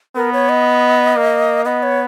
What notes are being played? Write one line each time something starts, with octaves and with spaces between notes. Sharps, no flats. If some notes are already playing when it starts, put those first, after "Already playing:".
B3 A#4
C#5
D#5
A#3
B3 D#5
C#5